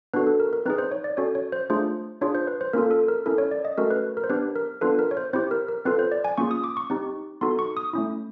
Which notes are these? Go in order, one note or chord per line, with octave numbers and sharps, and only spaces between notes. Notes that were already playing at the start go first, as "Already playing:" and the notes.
B3 D4 F#4 A4 B4
A4
A#4
A#4
C4 D#4 G#4 B4
C5
C#5
D5
C#4 F#4 A4 C#5
C#5
C5
A3 D4 F4 G#4 C5
D4 F4 G#4 C#5
C5
B4
C5
A#3 C#4 F4 A4 A#4
A4
A#4
C#4 E4 A4 A#4
C#5
D5
D#5
A3 C#4 F#4 A4 A#4
B4
A#4
C5
B3 D4 G4 B4
A#4
B3 D4 F4 A4 B4
A#4
C#5
C5
C4 E4 G4 C5
A#4
A#4
C4 F4 A4 B4
C5
D5
G#5
A#3 C#4 F4 G#4 C#6
D#6
D6
C#6
C4 D#4 G4
B3 D#4 F#4 A4 C6
C#6
D#6
A3 C#4 E4